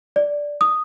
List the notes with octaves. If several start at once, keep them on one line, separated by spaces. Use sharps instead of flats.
D5
D#6